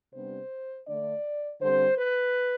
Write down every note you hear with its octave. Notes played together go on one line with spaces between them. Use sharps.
C3 G3 B3 D4 C5
D3 A3 D4 D5
D3 G3 C4 C5
B4